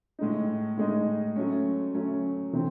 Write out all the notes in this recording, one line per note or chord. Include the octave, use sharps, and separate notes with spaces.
A2 G#3 D#4
A2 G#3 D#4
F#3 A3 C#4
F#3 A3 C#4
C3 E3 A3 C4